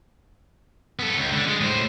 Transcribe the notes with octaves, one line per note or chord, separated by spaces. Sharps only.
B3 A4
C#2
D3
G#3
A2 C5